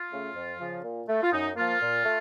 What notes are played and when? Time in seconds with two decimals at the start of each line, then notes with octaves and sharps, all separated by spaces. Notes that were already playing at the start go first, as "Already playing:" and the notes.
Already playing: F4
0.09 C#3 A3
0.35 F2
0.59 C#3 F3
0.83 A#2
1.08 A3
1.22 F4
1.31 F#2 D#4
1.56 F3 A#3 F4
1.81 A#2
2.04 A3